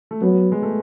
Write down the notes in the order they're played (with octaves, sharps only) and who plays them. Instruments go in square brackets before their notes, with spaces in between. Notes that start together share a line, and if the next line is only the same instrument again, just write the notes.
[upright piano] A3
[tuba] F#3 [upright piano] B3
[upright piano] G#3
A3